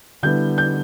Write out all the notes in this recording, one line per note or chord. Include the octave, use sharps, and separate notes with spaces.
D3 G3 B3 E4 G6
G6